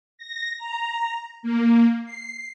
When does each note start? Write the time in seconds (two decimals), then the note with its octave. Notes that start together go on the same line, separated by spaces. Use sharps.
0.18 A#6
0.58 A#5
1.43 A#3
2.05 C7